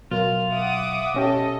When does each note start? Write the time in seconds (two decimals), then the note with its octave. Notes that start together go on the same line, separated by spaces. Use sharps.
0.11 B2 F#3 F4 A#4
0.50 E5 F#5 D6 D#6
1.15 B2 C#4 G4 A4 D#5